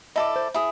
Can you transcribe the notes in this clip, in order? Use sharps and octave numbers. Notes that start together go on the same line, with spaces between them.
E4 A4 D5 D#5
C5
E4 G#4